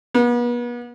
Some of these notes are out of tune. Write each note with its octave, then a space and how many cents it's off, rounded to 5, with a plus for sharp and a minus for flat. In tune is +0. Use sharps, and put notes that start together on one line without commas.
B3 -40